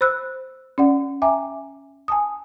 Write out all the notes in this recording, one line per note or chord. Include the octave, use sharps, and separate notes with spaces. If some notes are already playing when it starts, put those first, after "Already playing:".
C5 B5 E6 F#6
C#4 D5 F#5
E5 G5 G#5 A#5 D6
G#5 A5 D#6